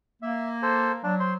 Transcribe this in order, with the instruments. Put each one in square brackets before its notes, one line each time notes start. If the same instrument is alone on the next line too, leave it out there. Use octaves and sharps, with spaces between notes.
[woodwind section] A#3 [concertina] E5
[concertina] A4 C5
[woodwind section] F#3 [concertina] D4
[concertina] C5 C6